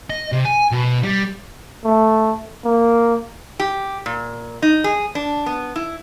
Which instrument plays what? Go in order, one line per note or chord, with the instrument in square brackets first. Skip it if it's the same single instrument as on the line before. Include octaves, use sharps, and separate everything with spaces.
[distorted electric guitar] D#5
C3
G#5
B2
G3
[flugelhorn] A3
A#3
[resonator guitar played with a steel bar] G4
A#2
D#4
G#4
D4
B3
E4